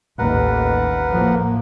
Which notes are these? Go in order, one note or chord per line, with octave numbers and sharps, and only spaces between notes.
A1 D#2 A#4 B4 F#5
A2 F3 A#3